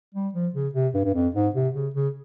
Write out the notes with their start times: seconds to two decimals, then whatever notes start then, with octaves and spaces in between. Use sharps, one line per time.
0.14 G3
0.33 F3
0.54 C#3
0.74 C3
0.94 G2
1.05 G2
1.14 F2
1.35 G#2
1.55 C3
1.75 C#3
1.94 C#3